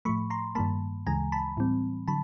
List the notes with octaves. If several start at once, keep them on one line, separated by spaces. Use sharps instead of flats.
A2 F3 A3 B5 C#6
A#5 C6
G2 D#3 G3 A#3 A5 B5
D2 C#3 E3 G#3 G#5 A#5
A5 B5
A2 E3 G3 C4
D3 F#3 A5 B5